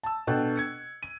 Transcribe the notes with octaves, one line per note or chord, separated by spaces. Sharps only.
A5 E6
B2 D4 A4 G5 F#6
G#6 C#7
D#7